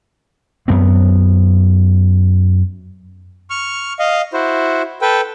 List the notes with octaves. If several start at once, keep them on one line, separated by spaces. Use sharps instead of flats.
F#2 B3 C4
C#6 F6
D#5 F5
E4 F#4 C5
A4 B4 G5